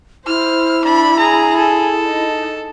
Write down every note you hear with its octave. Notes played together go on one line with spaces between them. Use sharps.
E4 C5 F6
D4 B5
G#4 A#5
A4
D#4